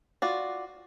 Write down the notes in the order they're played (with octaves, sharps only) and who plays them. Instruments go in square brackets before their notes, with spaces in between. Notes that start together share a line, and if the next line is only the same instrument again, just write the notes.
[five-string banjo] F4 F#4 D5